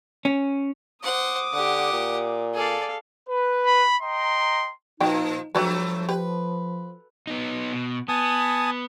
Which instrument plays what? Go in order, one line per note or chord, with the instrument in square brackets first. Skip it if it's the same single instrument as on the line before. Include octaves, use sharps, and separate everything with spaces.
[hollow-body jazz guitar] C#4
[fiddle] C5 F#5 [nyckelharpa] D6 D#6
[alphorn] D3 [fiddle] G4 F#5
[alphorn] A#2
[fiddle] G#4 D5 [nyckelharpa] A4 F5
[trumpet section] B4
[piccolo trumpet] B5
[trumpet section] D#5 G5 A#5 [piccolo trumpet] C6
[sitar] A#2 F3 [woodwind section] D#4 [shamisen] F#4 G5
[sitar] G2 F#3 A3 [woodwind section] F3 [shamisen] C4 F#4 B4
[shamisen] G4 [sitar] B4
[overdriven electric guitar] B3 D#4
B2
[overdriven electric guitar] B3 [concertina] G#5 A5 D#6